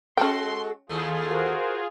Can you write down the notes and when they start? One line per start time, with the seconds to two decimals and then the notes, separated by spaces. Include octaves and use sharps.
0.17 G#3 C#4 F#4 A4 G5 C6
0.89 D#2 A3 F4 G#4
1.27 F#4 A#4 C5